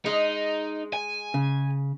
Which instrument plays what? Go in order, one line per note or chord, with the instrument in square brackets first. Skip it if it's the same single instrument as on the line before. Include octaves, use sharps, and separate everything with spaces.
[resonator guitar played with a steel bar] G#3 [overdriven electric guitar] D#4
[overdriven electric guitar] G#5
[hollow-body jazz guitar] C#3